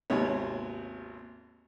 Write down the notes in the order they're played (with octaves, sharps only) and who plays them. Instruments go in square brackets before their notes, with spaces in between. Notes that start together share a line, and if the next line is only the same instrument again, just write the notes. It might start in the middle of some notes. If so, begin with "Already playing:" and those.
[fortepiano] G#1 D#2 C3 B3 C#5